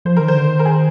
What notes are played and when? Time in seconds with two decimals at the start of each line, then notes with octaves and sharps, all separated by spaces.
0.05 F3 C5
0.17 D#3 A#4
0.28 C5
0.34 D3
0.47 D#3
0.59 A#4
0.65 G#4